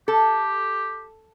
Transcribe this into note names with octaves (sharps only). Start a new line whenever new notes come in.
G4 A4